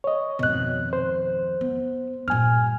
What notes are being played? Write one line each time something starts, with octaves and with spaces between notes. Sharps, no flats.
C#5 D#5
G#1 F2 B2 F#6
C5
B3
G2 A#2 G#5 F6